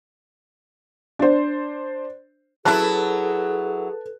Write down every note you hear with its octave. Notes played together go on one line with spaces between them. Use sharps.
D4 C5
F#3 E4 G#4 A4 B4 A5 F#6